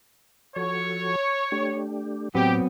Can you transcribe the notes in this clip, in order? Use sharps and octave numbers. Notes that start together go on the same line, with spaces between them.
F3 F#4 A4 C#5
A3 D4 G4
A2 F#3 B3 C4 G4